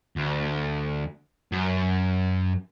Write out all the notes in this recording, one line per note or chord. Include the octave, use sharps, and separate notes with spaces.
D2
F#2